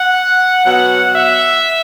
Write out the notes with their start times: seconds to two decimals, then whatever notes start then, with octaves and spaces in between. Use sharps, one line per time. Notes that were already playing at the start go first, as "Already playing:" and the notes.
Already playing: F#5
0.65 B2 F#3 F#5
1.15 E5